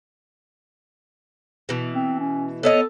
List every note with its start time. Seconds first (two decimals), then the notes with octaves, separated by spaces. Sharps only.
1.69 B2 E3
1.95 C4
2.20 C#4
2.63 B3 A4 C#5 D#5